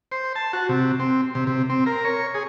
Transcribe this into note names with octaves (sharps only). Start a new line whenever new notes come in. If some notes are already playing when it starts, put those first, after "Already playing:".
C5
A5
F#4
C3
C4
C3
C3
C4
A#4
C#5
G#4